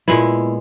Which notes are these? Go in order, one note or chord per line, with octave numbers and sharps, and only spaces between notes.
A#2 G#3 B3 E4